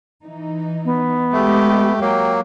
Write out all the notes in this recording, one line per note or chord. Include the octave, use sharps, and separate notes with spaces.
E3 D#4
B3
G#3 A3 G4
F#3 A#3 G5